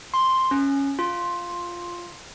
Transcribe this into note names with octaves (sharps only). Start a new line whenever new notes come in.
C6
C#4
F4